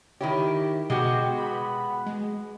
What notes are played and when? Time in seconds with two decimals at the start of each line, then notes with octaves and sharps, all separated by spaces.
0.21 D#3 E4 G4 C#5
0.90 B2 G#3 F#4 G4
1.38 B3 B5
2.06 G#3